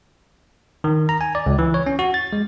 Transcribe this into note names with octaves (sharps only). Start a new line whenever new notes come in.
D#3
A#5
G#5
D5
C#2
E3
C#5
C#4
F#4
A6
G#3